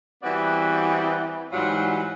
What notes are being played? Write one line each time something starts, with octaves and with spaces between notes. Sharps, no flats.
E3 G3 B3 C4 F#4 D5
G#2 E3 F#3 G3 F4 F#4